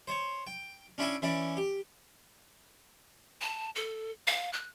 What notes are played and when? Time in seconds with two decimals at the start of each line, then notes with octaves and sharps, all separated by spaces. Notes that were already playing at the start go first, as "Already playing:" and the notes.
0.08 C5 C#5
0.47 G5
0.98 C#4 D4 E4 E5 G5 G#5
1.22 E3 C#4 E4 D5
1.57 G4
3.41 A5
3.75 A4
4.27 F5
4.53 F#6